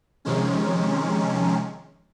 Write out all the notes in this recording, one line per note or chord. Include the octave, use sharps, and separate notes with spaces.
C3 D#3 F3 G#3 C#4